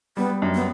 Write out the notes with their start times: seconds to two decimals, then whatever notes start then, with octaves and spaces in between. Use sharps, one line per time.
0.17 G3 B3
0.42 F#2
0.55 B3